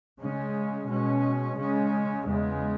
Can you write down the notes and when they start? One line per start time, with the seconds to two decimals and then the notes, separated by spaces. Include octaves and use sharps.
0.19 C#3 G#3 C#4
0.87 B2 G#3 C#4
1.56 C#3 G#3 C#4
2.25 E2 C#3 G#3